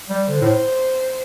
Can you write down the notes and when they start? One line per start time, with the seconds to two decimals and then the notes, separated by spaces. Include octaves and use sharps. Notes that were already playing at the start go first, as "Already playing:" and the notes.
0.10 G3
0.28 D3 C5
0.41 A2